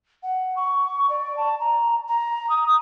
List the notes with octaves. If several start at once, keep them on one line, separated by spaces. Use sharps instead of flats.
F#5
C#6
D5
A5
A#5
A#5
D#6